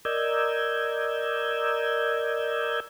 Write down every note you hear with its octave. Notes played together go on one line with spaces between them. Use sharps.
A#4 D5 D#5 E6 G6 G#6